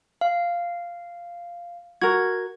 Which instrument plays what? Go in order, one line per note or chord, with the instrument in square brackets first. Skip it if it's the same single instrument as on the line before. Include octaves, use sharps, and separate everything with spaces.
[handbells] F5
[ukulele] F#4 A#4 [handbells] G#6